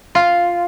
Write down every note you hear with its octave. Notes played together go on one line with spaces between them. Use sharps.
F4